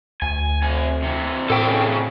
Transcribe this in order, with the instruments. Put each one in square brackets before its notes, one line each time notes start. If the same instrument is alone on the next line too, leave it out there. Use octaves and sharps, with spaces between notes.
[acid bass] D2 [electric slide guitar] G#5
[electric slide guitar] C3 G#5
C3 E3
[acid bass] A2 [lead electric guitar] A4 G5
[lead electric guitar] C#3